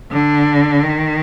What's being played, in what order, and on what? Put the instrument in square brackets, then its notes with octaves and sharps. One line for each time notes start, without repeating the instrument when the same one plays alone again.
[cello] D3
D#3